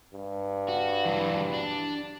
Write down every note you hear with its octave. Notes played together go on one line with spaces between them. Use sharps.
G2
F#4
E3 F#3
D4